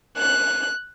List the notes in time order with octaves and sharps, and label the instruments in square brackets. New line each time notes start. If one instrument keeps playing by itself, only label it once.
[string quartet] F#6